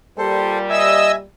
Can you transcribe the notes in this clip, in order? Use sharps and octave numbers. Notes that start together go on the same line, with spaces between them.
A#2 G3 A4 C5
D#5 E5 G#5 E6